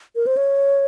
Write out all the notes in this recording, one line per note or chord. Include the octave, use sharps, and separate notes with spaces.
A#4
C5
C#5